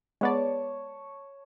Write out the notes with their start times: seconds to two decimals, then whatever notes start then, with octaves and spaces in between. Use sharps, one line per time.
0.21 G#3 B3 C#5 D5 A5